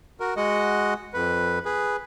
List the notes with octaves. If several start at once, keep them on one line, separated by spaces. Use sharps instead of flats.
F#4 A#4
G#3 F#4 D#5 F#5
F2 B4
G#4 B4